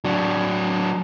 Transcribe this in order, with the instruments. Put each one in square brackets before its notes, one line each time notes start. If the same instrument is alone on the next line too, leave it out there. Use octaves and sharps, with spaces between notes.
[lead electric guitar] F#3 D4